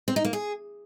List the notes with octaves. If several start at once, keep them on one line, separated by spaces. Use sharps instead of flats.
C4
D#4
A#3
G#4